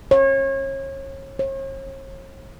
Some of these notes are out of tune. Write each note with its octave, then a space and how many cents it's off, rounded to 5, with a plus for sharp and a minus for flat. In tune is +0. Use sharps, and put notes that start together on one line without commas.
C#5 -30
C#5 -45